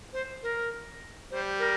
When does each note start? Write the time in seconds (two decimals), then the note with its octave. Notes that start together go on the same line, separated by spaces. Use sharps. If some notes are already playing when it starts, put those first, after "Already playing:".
0.13 C5
0.43 A#4
1.30 G3 C5
1.59 A#4